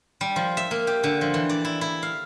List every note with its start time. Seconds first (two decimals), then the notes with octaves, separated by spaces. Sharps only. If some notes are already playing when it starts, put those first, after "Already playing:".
0.21 G3
0.36 F3
0.57 E5
0.71 A#3
0.87 G4
1.04 D3
1.21 F3
1.34 E3
1.49 D5
1.65 E4
1.81 E4
2.03 F5